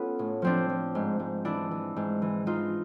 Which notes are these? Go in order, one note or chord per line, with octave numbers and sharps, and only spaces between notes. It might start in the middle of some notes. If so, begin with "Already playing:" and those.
Already playing: B3 C#4 F4 A4
A2
F3 C4 D4
F3
G#2
G#2
E3 D4 E4
E3
G#2
E3
E3 D#4 F4